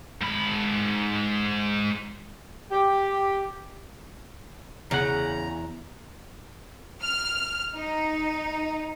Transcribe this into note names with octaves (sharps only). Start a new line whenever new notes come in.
G#2 B5
G4
E2 C#3 F#5 A#5
F6
D#4